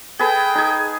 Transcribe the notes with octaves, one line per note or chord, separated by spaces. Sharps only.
G#4 A4 B4 G5
D#4 G#4